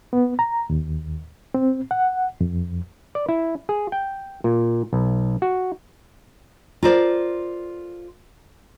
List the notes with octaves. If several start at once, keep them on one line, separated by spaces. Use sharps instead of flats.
B3
A#5
D#2
C4
F#5
F2
D5
E4
G#4
G5
A#2
B1
F#4
F4 A4 A#4 C5 D5